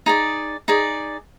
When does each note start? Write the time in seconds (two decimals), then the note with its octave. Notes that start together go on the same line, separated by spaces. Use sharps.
0.06 D#4 G#4 D5
0.68 D#4 G#4 D5